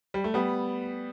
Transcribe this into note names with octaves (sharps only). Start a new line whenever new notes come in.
G3
A3
G3 B3